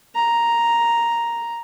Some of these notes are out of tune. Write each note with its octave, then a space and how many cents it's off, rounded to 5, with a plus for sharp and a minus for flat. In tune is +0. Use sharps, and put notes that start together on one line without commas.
A#5 +0